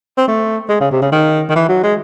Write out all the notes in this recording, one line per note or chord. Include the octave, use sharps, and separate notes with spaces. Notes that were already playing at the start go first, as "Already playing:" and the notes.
C4
A3
G#3
C#3
C3
C#3
D#3
D#3
E3
F#3
G#3